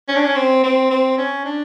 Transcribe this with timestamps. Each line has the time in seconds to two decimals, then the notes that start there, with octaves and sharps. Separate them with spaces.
0.08 C#4
0.16 D4
0.23 C#4
0.36 C4
0.64 C4
0.91 C4
1.18 C#4
1.45 D4